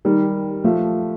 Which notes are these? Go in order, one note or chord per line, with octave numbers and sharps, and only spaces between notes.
D#3 G3
F3 A3